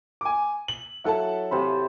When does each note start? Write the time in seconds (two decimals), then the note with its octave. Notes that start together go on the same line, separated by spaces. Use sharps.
0.21 G#5 D6
0.68 F#7
1.04 F#3 E4 A4 F#5 A5
1.51 C3 C5 B5